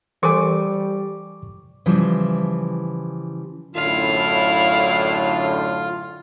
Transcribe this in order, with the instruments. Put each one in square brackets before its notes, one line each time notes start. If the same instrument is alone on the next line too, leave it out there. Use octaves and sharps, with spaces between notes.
[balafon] E3 [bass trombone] G3 [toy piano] A4 A#4 G#5 [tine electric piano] C#6 D6
[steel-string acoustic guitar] C#3 E3 F3 G3
[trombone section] F#2 A2 D3 [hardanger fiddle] E4 F5 [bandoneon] F4